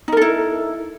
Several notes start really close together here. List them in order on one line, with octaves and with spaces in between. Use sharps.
D#4 A#4 A4 E4